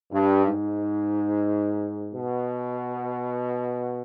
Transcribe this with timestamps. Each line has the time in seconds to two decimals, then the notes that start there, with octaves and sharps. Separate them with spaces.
0.11 G2
0.44 G#2
2.14 B2